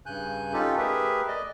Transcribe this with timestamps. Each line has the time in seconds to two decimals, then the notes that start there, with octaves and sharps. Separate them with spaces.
0.06 G2 C#3 G#5 F#6 G6
0.53 C#4 D#4 F4 G4 A4
0.78 A3 G4 G#4 A#4 B4 E5
1.28 D5 D#5